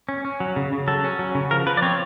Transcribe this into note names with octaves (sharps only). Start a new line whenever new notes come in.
C#4
C#4
F#3
C#3
C#3
F#3 A4
C#4
F#3
C#3
F3 A#4
F3 B4
D5
C4 C#5